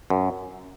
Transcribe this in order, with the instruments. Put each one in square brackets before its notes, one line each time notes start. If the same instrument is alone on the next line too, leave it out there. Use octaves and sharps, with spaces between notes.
[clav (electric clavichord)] F#2